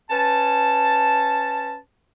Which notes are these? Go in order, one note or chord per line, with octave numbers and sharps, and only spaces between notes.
C#4 B4 A5